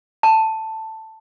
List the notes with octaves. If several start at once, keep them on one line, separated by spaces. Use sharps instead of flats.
A5